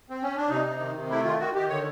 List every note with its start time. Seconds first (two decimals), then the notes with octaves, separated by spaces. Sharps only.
0.10 C4
0.22 C#4
0.37 D4
0.49 C3 D#4
0.64 C3
0.80 D#3
0.95 C3
1.10 A3 E4
1.24 D#3 F4
1.39 D#3 F#4
1.54 D#3 G4
1.69 D3 C#5